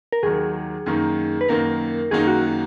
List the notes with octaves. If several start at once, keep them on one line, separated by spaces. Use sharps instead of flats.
A#4
D#2 D#3 F#3 G#4
F#2 D#3 A#3 D#4
B4
F#2 D#3 A#3 D#4 A#4
F#2 D#3 F#3 A#3 D#4 G#4
F#4